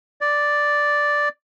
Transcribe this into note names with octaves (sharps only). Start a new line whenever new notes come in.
D5